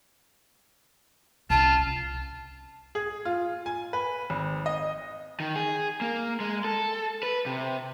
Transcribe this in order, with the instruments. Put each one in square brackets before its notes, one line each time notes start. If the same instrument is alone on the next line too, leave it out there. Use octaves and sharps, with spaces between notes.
[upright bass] C2 C#4 [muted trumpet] F4 [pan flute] A5
[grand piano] G#4
F4
G#5
B4
G#1
D#5
[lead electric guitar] D#3
G#4
A#3
G#3
A4
B4
C3